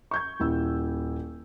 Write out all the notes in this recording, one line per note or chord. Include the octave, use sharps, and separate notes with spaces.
C#6 G6 G#6
D#1 E4 E6